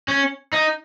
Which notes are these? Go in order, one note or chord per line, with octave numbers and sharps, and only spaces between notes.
C#4
D#4